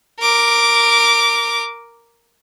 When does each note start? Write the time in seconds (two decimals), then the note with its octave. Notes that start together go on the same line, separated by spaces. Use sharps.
0.20 A#4 D6